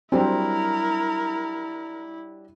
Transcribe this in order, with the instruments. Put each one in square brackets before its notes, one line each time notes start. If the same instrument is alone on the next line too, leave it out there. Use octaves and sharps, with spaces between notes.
[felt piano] F#3 G3 D4 [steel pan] C4 [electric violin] E4 [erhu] A#4